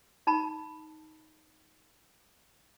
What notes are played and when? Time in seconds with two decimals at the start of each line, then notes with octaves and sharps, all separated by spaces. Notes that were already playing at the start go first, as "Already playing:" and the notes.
0.27 D#4 A5 B5